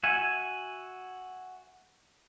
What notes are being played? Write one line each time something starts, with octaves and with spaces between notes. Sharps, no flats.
F#4 E5 G#5